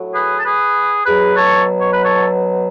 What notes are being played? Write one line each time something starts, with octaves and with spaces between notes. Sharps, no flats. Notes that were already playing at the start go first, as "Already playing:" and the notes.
Already playing: A2 F#3
G#4 B4
A4
G#4 B4
B2 F#3 G#4 B4
A4 C#5
C#5
B4
A4 C#5